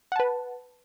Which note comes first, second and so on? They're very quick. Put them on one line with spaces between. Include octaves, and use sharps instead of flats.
F#5 A5 B4